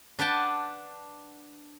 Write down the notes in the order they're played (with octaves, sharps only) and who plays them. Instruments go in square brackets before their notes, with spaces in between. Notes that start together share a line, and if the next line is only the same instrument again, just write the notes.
[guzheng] D4 B4 F#5 G5 A5